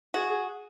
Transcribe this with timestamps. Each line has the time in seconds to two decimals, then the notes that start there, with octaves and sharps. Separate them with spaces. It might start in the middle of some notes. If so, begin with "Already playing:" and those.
0.14 F#4 G#4
0.30 G#4